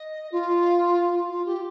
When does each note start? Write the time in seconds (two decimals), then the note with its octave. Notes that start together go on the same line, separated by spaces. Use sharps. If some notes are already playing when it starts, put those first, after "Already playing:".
Already playing: D#5
0.32 F4
1.29 F4
1.46 G4